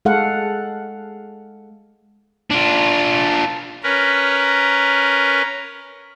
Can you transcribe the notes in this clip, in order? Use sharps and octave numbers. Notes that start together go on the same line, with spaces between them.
G#3 A4 F5 F#5
D4 F4
C#4 A#4 B4